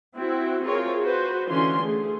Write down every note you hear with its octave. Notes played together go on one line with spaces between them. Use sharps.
C4 E4 F#4
C4 F4 G#4 A#4 C#5
F#4 B4 C5
D3 E3 C#4 F4 C6
A3 G#4